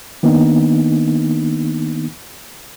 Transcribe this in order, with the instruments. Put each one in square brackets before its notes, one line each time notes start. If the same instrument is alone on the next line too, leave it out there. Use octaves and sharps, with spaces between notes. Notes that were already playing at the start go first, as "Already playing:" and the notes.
[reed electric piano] D#3 A#3 B3 D4 D#4